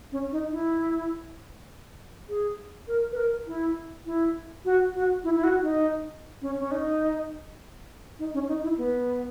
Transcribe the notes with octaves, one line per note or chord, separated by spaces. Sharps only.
C#4
D#4
E4
G#4
A#4
B4
A#4
E4
E4
F#4
F#4
E4
E4
F#4
D#4
C#4
C#4
D#4
D#4
C#4
D#4
E4
B3